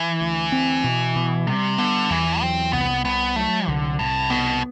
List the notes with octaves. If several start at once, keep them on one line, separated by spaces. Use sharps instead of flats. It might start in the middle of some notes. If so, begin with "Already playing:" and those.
Already playing: E3
D2
C4
B2
B2
C3 G3
D3 B3
E2 E3
F#3 C4
C2 B3
C2 B3
F#3 A3
C2 D3
C2 A2
B2 B3